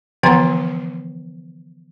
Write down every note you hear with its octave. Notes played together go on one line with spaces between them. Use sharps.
D3 E3 F3 B3 F#5